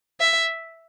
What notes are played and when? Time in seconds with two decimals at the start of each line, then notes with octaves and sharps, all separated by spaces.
0.20 E5